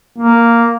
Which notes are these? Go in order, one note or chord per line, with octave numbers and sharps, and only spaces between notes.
A#3